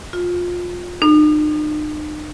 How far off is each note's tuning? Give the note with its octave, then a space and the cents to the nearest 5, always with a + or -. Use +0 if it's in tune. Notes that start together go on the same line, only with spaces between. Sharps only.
F4 +20
D#4 -45